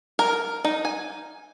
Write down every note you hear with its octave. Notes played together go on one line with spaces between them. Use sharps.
A#4
D#4
G#5